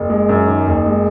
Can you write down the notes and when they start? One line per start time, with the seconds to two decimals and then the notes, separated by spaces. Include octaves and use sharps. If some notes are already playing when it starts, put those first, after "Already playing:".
Already playing: F#1
0.10 G#3
0.29 F#2
0.47 D#3
0.67 F#1
0.86 G#3